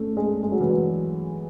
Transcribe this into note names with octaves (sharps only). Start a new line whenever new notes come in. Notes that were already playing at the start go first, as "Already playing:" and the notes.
Already playing: A3 C#4
G#3
G#3
F#3
E3
F#3